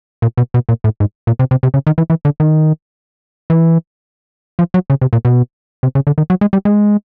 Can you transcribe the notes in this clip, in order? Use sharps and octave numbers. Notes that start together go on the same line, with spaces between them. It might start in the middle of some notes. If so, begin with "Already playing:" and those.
A#2
B2
B2
A#2
A2
G#2
A#2
C3
C3
C3
C#3
D#3
E3
E3
D3
D#3
E3
F3
F#3
C#3
C3
A#2
B2
C3
C#3
D3
D#3
F#3
G#3
G3
G#3